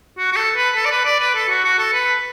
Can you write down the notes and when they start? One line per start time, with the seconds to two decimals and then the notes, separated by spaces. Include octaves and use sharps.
0.18 F#4
0.32 F#4
0.36 A4
0.56 B4
0.76 A4
0.85 D5
0.91 B4
1.05 D5
1.20 B4
1.35 A4
1.49 F#4
1.64 F#4
1.79 A4
1.93 B4